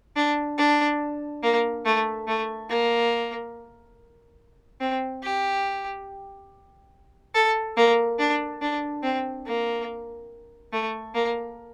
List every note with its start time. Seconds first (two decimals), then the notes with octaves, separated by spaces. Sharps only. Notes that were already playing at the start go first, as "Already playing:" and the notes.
0.16 D4
0.58 D4
1.43 A#3
1.85 A3
2.28 A3
2.70 A#3
4.81 C4
5.23 G4
7.35 A4
7.77 A#3
8.19 D4
8.62 D4
9.03 C4
9.46 A#3
10.73 A3
11.15 A#3